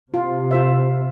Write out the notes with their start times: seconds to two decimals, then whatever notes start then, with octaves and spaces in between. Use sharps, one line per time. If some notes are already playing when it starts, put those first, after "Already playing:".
0.14 C3 F4
0.51 F4 C5 E5